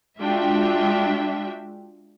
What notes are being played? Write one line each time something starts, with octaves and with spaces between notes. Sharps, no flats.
G#3 D4 F4 F#4 E5 G5